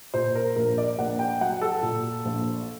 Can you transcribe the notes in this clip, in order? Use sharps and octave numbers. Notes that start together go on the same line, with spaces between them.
A#2 C5
A#4
A#1 A#4
D5
A#1 F#5
G5
F#3 F#5
A4
A#2
A#1